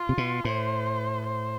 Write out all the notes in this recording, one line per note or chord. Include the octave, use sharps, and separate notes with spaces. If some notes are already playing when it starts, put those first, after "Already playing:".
Already playing: F4
C3
B2
A2 C5
C5